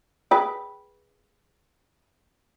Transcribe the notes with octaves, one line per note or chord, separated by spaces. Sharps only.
G#4 B4 G5